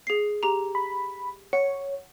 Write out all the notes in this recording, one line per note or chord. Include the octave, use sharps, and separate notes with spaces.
G#4 C7
G4 A#5
B5
C#5 F#5